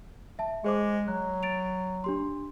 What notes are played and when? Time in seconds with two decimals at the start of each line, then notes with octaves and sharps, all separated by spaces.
0.39 E5 A5
0.64 G#3 G#4 C5 D6
1.08 F#3 F#6
1.43 A6 D7 F7
2.04 D4 G4 C6